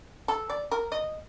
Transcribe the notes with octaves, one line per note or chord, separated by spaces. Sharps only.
A4
D5
A#4
D#5